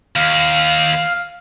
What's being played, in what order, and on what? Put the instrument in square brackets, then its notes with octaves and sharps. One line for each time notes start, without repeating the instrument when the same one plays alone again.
[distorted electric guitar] D#2 [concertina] F5